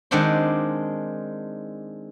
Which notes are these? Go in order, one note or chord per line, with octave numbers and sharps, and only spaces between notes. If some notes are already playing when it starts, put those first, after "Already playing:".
D#3 G#3 C4 D4 F#5 C6